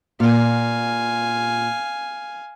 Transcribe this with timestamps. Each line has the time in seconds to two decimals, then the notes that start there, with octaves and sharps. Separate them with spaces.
0.20 A#2 F5 G#5